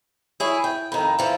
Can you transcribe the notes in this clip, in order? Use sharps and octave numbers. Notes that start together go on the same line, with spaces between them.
E4 G#4 C#5
G5
F2 D#3 A#5 B5
E3 F3